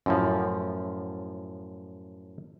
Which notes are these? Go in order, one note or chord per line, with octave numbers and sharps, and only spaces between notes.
F#2 A2 F3